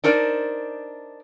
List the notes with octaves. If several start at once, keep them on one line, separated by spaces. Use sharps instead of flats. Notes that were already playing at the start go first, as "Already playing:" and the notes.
D4 D#4 A#4 C5 D5